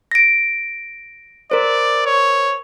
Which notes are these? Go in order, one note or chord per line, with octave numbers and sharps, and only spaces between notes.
A#6 D7
A#4 C5 D5
C#5